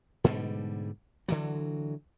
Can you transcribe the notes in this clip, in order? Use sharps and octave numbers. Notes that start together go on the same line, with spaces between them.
G#2 B2 D3 G3
D3 E3 F#3